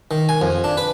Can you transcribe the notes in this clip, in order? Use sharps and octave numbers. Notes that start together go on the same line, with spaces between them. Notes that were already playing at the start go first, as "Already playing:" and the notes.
D#3
G#5
F2
D4
B4